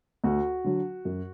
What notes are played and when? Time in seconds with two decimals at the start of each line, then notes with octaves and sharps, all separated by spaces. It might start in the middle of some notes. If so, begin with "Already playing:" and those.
0.24 D2 F#4
0.64 D3 F#3
1.05 F#2